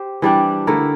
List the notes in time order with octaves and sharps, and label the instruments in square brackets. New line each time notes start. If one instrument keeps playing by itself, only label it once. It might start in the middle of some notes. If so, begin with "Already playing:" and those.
Already playing: [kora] G4 C5
E3 G3 D4 G4
D3 A3 E4 A#4